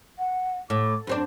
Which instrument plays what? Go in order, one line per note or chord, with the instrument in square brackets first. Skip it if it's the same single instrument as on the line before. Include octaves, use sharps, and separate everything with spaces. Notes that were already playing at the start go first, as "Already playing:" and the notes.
[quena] F#5
[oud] A2 [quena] D6
[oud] F#2 C4 D4 [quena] C5